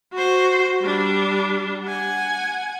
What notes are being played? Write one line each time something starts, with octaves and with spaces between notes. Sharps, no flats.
F#4 C5
G3 D4
F#5 G#5